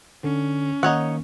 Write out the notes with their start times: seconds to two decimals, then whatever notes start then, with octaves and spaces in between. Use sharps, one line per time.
0.24 D3 C#4
0.83 D#3 A#3 D#4 C#5 F#5